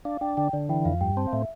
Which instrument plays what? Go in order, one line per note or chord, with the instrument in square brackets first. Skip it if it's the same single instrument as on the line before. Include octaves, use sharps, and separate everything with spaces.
[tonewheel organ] D4 [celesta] F5
[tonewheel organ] D4 [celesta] G5
[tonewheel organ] D3 [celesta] G5
[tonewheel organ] D3 [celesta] D5
[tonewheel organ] E3 [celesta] G5
[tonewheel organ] F2 [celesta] F5
[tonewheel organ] G2 [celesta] G5
[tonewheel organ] C4 [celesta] A5
[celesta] F5
[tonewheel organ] A2 [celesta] E5